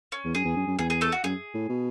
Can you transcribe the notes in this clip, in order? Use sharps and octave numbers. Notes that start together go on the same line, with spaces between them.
C#4
E2
F#2 G#4
E2
F#2
F#2
E2 G#4
G#4
A3 A4
F#4
F#2 G#4
A2
B2